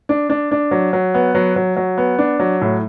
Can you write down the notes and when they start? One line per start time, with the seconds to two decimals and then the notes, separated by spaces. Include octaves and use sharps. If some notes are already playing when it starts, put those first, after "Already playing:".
0.09 D4
0.30 D4
0.51 D4
0.71 F#3
0.93 F#3
1.14 B3
1.35 F#3
1.56 F#3
1.76 F#3
1.98 B3
2.19 D4
2.40 F#3
2.61 A2